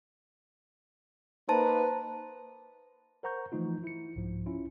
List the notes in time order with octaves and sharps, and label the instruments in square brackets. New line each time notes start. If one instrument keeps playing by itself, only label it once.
[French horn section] A#3 D#4 B4 [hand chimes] C5 A5 A#5
[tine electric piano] A#4 C5 F#5 A#5 C#6 G6
E3 F3 A3 D#4 F4
E4 C#7
C2 G#2 F3
C#4 E4 F4